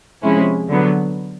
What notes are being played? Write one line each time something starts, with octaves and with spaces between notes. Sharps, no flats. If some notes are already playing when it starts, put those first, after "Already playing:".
C3 F3 G#3 C#4 E4
D3 F#3 B3